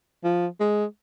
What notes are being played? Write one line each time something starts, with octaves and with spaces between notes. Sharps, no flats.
F3
G#3